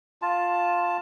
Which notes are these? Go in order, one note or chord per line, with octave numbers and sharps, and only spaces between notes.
F4 A5